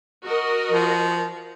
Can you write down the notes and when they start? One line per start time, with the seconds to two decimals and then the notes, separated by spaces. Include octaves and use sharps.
0.23 F#4 A#4 D#5
0.71 F3